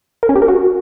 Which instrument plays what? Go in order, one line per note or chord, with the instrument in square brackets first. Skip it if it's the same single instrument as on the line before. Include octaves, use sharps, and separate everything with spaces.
[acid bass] A#4
C#4
G4
A#4
F#4